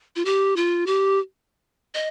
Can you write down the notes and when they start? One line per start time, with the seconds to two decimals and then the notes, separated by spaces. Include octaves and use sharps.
0.16 F4
0.25 G4
0.56 F4
0.87 G4
1.94 D#5